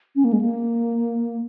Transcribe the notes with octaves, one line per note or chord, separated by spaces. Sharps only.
C#4
A#3
G#3
A#3